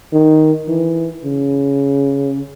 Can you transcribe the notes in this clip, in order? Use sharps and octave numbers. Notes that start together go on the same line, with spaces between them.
D#3
E3
C#3